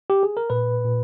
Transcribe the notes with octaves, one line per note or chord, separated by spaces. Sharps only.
G4
G#4
A#4
A#2 B4
A#2